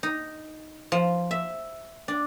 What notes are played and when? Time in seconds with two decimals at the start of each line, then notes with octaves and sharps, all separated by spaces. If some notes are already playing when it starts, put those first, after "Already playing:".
0.03 D#4
0.92 F3
1.31 E5
2.08 D4